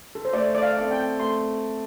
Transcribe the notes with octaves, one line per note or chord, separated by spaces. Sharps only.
A4
C5
A3 D5
D5
F5
C4 A4 D5
G5
A3 C6